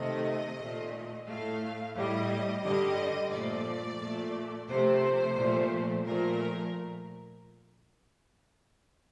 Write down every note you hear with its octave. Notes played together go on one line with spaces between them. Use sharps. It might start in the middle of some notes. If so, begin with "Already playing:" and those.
Already playing: C3 D#3 A3 D#5
A#2 A3
A2 A3 F5
A2 G3 D#5
G2 D3 G3 D#5
A#2 F3 A3 D5
A#2 A3
C3 F3 A3 C5
A#2 F3 A3
A#2 F3 A3 A#4